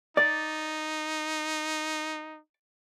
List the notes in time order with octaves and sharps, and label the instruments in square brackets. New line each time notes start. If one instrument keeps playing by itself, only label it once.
[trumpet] D#4 [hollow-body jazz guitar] D5